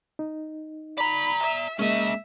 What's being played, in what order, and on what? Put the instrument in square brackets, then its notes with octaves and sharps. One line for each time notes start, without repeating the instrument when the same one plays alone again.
[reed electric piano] D#4
[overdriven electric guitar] D5 A#5 [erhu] B5
[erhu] E5
[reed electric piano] G#3 A#3 [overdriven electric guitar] C#4 D#5 [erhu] E5